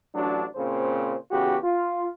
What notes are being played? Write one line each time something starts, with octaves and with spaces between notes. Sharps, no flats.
A1 F#3 D4
A#2 C#3 C4 C5
E2 C#3 F#4 G4
F4